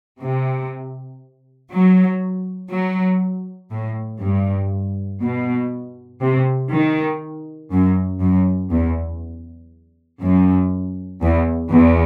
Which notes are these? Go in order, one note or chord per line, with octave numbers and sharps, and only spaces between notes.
C3
F#3
F#3
A2
G2
B2
C3
D#3
F#2
F#2
E2
F#2
E2
E2